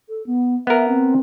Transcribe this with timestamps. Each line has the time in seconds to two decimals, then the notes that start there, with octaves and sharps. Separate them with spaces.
0.09 A4
0.26 B3
0.67 B3 A#4 E5
0.88 C4